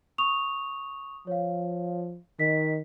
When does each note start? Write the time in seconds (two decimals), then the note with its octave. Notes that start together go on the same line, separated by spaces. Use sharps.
0.18 C#6 D#6 F7
1.27 F3 C#5 F5
2.39 D#3 D#5 B6